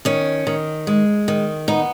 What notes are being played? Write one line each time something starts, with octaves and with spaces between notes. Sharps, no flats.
D#3 C#4
D#3
G#3
D#3
B3 D#4